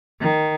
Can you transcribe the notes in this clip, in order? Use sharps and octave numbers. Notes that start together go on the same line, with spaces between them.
D#3